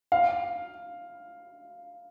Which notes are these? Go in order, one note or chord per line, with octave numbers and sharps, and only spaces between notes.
F5